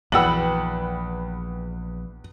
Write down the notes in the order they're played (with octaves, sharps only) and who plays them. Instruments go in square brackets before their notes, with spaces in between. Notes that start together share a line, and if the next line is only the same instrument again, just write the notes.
[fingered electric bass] A#1 [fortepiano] E2 F#4 E6 [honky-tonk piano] B4 G5 F#7